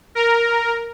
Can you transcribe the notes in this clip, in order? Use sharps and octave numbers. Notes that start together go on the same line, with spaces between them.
A#4